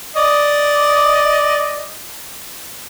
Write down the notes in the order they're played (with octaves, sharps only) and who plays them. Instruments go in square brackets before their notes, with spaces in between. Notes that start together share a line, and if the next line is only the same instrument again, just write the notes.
[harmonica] D5 D#5